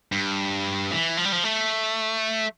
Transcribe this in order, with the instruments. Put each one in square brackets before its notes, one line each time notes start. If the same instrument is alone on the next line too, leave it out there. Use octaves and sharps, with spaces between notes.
[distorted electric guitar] G2
E3
F3
G3
F3
A3